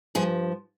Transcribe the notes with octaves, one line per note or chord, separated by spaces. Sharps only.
G2 F3 G#4